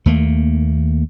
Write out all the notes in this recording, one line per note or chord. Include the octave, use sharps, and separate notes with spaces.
D#2 A3 A#3